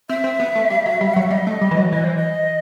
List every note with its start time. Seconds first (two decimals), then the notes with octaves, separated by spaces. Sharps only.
0.09 C4 E5
0.24 C4
0.39 B3
0.55 A3
0.70 G3
0.86 F#3
1.01 G3
1.14 F#3 F#5
1.23 E5
1.30 G3 D#5
1.47 A3
1.61 G3
1.71 E3
1.77 F#3
1.92 E3 D#5
2.04 C5
2.16 D#5